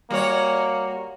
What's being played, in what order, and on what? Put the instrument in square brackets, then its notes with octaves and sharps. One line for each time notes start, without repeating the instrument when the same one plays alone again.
[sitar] G3 F#4 C#5 [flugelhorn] A#3